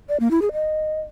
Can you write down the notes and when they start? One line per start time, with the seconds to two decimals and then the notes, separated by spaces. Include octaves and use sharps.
0.09 D5
0.20 A#3
0.31 E4
0.42 G#4
0.53 D#5